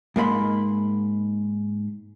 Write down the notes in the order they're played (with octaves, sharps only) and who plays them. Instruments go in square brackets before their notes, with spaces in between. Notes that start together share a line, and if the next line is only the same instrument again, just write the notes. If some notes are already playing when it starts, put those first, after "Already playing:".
[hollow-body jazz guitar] G#2 A#3 A#4 B5 C6